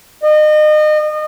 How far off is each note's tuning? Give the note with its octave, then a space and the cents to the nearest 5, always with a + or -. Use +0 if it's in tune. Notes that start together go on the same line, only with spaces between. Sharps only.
D#5 -30